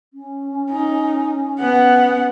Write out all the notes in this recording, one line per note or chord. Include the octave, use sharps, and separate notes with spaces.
C#4
D#4
B3 F#5